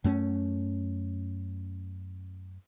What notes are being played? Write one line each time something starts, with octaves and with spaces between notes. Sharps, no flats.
F#2 A3 C4 C#4